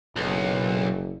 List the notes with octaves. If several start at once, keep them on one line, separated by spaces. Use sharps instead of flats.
F#1 B1